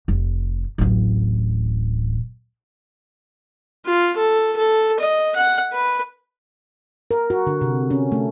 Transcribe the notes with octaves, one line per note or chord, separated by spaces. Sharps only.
F1
D1 A1
F4
A4
A4
D#5
F#5
B4
A#4
F#4
D3
C3
C#4
A3